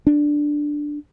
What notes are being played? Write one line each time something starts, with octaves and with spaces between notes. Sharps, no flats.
D4